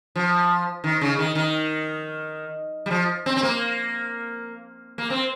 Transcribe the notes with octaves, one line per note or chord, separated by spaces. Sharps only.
F3
D#3
C#3
D#3
D#3
G3
F3
C4
C4
A#3
A#3
C4